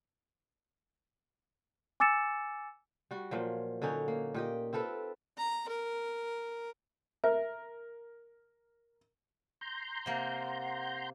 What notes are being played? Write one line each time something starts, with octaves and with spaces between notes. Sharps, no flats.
G#5 D6 E6 A6 C#7 E7
G3 F#4
A#2 F3 F#3
D3 F#3 C#4 D#4
A#3
A#2 G4 D#5
C4 F4 A4 B4
A#5
A#4
A#4 E5
A#5 C6 G6
C3 A#3 F#5